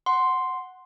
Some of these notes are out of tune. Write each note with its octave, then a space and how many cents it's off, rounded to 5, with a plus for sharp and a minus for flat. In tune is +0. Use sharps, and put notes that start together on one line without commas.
F#5 +0 C6 +0